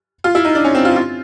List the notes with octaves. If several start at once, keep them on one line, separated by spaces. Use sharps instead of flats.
F4
E4
D#4
D4
C#4
C4
F4
F4